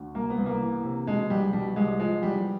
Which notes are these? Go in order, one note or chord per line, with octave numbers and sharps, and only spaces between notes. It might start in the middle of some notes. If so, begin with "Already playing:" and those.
Already playing: D2
C2 A#3
B3
C2
A#3
E3
C3
B2 G#3
C2 G3
B2 G3
C2 G#3
F3 G#3
E2 G3